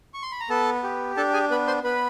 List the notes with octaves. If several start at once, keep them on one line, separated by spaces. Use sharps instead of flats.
C#6
C6
B5
A#5
B3 A4 A5
G4
D4 A4 A5
G#4 G#5
B3 B4 B5
C5 C6
B3 B4 B5